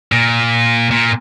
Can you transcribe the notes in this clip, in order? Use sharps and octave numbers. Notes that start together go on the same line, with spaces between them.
A#2
A#2